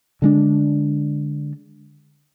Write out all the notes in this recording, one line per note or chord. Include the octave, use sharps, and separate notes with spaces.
D3 G#3 D4